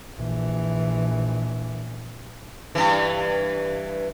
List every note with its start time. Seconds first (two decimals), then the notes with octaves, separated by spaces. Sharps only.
0.17 A#1 E3
2.75 G2 E3